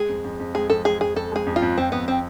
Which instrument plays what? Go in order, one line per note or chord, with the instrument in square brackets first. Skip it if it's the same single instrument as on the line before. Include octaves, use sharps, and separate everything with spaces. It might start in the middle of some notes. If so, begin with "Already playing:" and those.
Already playing: [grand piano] G#3 [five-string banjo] G#4
[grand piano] F2
F2
F2
[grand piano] G#3 [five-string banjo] G#4
[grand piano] F2 [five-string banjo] A4
[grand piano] G#3 [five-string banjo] G#4
[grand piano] F2 [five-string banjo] G#4
[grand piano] F2 [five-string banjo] A4
[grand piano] G#3 [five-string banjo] G#4
[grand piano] F2
[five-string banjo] F4
[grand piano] F2
[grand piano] F2 [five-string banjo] C4
[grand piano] F2 [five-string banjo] B3
[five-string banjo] C4